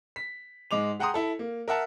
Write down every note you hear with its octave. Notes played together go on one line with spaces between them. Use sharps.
B6
G#2 G#3 D6 F7
G#4 F#5 G5 A#5 C6 D#6
E4 A4
A#3
A#4 E5 F#5 A5